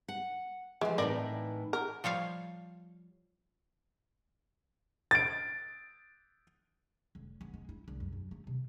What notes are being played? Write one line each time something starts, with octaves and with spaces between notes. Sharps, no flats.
F#5
E3 F3 G#3
A2 E3 C4 D#4 A#4 D5
A#4
F3 G3 C#5 F5
A6 D7
F1
B3
G#3
E4
C2
F2
F#2
A3
C3